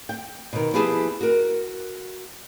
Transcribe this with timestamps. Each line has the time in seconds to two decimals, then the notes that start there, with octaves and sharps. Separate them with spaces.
0.09 G5
0.53 B2 D#3
0.73 F3 B3 E4 G4 G#4 A5
1.21 F#4 A#4